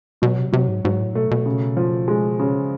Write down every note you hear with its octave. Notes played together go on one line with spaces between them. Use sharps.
B2 F#3
C3
C3 F#3
G#2
G#2 F#3
A2
B2 A3
B2
C#3
F3
G#3
C#3